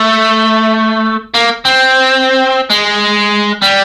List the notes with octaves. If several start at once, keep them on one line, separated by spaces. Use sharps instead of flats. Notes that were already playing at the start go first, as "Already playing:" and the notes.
Already playing: A3
A#3
C4
G#3
G3